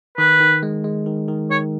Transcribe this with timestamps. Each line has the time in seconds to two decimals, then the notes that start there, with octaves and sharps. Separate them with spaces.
0.18 D#3 B4
0.40 D#3
0.63 G#3
0.84 G#3
1.06 D#3
1.28 D#3
1.51 D#3 C#5